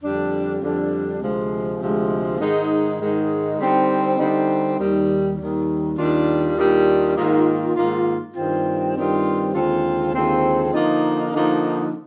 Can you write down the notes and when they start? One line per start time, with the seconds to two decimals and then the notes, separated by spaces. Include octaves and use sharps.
0.02 F2 D3 G3 D4
0.62 F2 D3 G3 D4
1.21 D2 C3 F3 G#3
1.81 D2 C3 F3 G#3
2.40 G#2 D#3 G#3 D#4
3.01 G#2 D#3 G#3 D#4
3.60 D3 G3 C4 D#4
4.19 D3 G3 C4 D#4
4.79 D#2 D#3 G3
5.38 D#2 D#3 G3
5.97 D#2 D#3 G3 D4 F4
6.57 D#2 D#3 G3 D4 F4
7.17 G#2 D#3 A#3 F4
7.77 G#2 D#3 A#3 F4
8.36 G2 D#3 G3 C4 F4
8.96 G2 D#3 G3 C4 F4
9.55 D#2 D3 G#3 C4 F4
10.13 D#2 D3 G#3 C4 F4
10.73 D3 F3 A#3 D#4
11.33 D3 F3 A#3 D#4